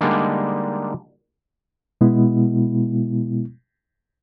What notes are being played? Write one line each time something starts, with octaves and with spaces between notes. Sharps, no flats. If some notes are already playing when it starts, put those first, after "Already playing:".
D3 G3 G#3 A#3 D4 D#4
B2 G#3 B3 E4